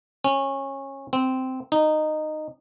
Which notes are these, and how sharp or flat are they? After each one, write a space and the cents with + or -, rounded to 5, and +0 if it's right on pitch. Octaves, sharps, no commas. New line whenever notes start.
C#4 -20
C4 -10
D#4 -15